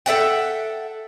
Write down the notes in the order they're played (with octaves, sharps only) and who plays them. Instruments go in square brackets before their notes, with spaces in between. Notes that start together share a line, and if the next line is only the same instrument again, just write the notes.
[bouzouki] A4 E5 F#5 G5